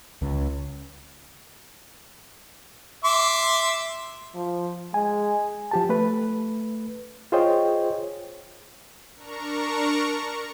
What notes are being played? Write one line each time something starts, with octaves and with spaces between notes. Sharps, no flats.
C#2
E5 C6 D6
F3
G#3 G#5
F3 G4 A5
A3 B4
F4 G#4 C5 C#5 D#5 G5
D4 A#4 A#5 C#6